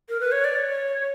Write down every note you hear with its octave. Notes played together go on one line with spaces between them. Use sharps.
A#4
B4
C#5
D5
C#5